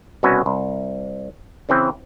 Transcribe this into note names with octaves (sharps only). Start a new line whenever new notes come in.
C2 B2 C#4 F#4 B4 E5
C2
C#3 E3 C4 B4